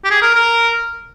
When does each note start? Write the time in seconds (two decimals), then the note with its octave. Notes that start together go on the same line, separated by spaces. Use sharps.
0.04 G4
0.11 G#4
0.22 A#4
0.35 A#4